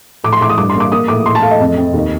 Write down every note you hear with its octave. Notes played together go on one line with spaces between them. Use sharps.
A2 D6
C6
A2 D6
D#6
G2 D6
C6
A#3 D6
A#3 D#6
A2 D6
A2 C6
A5
A3 F5
D#5
F2
C4
D#2